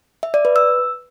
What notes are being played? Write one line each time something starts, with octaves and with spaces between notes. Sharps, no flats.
E5
D5
B4
E6